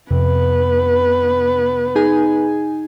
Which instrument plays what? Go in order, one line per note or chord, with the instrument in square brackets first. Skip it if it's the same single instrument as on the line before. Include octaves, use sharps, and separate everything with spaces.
[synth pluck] F2 C3 [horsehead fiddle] B3 B4
[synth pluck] D#4 G#4 G#5